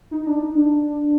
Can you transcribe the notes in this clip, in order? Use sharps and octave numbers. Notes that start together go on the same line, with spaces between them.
D#4
D4
D#4
D4